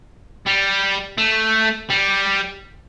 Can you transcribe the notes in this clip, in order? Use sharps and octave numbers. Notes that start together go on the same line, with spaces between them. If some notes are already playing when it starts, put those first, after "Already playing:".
G3
A3
G3